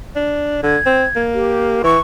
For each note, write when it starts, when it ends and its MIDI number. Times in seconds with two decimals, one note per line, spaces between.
0.16 0.60 62
0.63 0.77 50
0.63 1.21 92
0.86 1.05 60
1.16 1.83 58
1.34 1.82 67
1.84 1.98 52
1.84 2.00 85